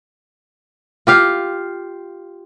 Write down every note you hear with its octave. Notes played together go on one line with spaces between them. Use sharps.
F4 G4 F5